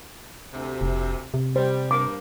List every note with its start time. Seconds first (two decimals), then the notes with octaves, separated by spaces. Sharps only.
0.53 D2 C3
0.81 F1
1.34 C3
1.56 G3 C5
1.91 G2 A#3 D6